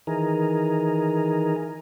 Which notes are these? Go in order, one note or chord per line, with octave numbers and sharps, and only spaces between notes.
D#3 E3 G#4 A#4